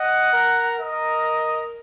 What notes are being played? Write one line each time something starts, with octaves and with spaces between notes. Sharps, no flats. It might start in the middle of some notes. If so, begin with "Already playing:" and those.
Already playing: D#5 F#5
A#4
A#4 D#5